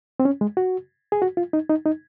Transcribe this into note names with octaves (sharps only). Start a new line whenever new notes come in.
C4
C#4
G#3
F#4
G#4
F#4
F4
D#4
D#4
D#4